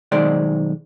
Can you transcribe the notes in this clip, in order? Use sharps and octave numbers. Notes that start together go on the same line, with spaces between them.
B1 D#3 G#3 C5 D5